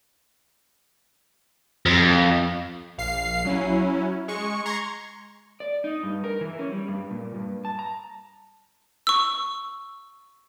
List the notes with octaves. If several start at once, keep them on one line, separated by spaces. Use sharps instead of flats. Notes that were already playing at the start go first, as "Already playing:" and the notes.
F2
A#1 F5 C7
F#3 C#4 E4
G#3 C#6
A#5 C6 C#6 G#6
D5
D#4
G2
A#4
E3
C#4
G3
G2
A#2
G2
A5
A#5
C#6 E6